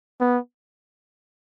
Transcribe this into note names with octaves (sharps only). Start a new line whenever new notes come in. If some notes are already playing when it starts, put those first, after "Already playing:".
B3